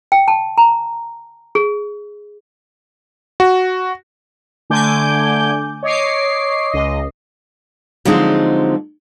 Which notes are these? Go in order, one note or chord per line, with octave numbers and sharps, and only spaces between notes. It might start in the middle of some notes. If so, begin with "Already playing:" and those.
G5
A5
A#5
G#4
F#4
D3 A3 G#5 D6 G6
C#5 D#5 D6 C7
C#2 D#5
D3 F3 F#3 G#3 C4 D#4